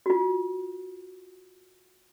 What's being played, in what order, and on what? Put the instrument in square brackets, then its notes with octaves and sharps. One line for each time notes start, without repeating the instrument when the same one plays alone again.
[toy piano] F4 F#4